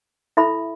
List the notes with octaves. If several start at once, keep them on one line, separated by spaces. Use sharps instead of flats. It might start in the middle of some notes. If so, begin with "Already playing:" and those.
E4 A4 E5 B5